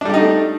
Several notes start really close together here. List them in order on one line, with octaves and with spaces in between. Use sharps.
D4 G3 G4 D#4 A3